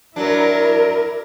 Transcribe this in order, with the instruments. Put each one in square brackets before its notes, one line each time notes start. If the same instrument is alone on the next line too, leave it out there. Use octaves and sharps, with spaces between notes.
[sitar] F#3 D4 [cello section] E4 A#4